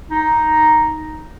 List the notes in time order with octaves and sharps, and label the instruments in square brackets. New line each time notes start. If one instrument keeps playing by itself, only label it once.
[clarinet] D#4